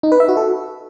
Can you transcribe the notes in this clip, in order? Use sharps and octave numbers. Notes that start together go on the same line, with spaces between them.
D#4
B4
E5
F#4
A4